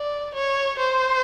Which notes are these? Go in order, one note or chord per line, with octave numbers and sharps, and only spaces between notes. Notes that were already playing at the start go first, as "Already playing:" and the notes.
Already playing: D5
C#5
C5